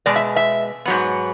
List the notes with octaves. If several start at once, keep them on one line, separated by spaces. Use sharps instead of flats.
B2 G#3 D5
E5
E5
G#2 F#3 B3